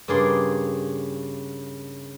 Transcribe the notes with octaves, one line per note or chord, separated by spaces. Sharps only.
G2 C#3 A#3 G#4 D5 C6